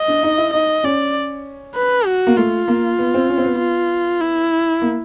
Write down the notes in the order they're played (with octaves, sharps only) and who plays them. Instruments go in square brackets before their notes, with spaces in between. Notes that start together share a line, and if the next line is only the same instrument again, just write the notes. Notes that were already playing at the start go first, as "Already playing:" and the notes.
Already playing: [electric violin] D#5
[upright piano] D4
D#4
E4
[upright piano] D#4 [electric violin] D#5
[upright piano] C#4 [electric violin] D5
[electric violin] B4
F#4
[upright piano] A#3
[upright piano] A3 [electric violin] F4
[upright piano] A#3
B3
C4
C#4
C4
B3
[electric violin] F4
E4
[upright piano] A#3